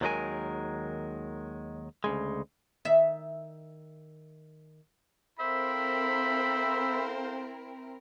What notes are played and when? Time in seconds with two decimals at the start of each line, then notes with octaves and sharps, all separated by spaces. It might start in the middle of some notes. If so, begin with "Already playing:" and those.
0.01 D#2 D#3 F#3 G#3 A#4 G#5
2.04 D2 C#3 G#3
2.85 D#3 E5
5.39 C4 E4 A4 A#4 C5 E5 F5 B5